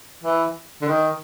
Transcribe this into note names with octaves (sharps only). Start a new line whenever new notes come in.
E3
D3
D#3